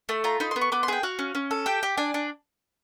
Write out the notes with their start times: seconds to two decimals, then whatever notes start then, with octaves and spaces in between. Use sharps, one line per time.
0.09 A3 A5
0.24 F4 A#5
0.40 D#4 B5
0.51 C6
0.56 B3
0.61 C#6
0.72 B3 D6
0.83 C6
0.88 G#4 G5
1.03 F#4 F5
1.19 C#4
1.35 C#4
1.51 A4
1.66 G4 G5
1.83 G4
1.97 D4 G#5
2.14 D4